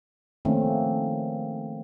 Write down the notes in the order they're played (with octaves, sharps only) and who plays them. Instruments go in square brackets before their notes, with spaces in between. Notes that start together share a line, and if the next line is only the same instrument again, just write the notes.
[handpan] D#3 F3 A3 A#3 C4 C#4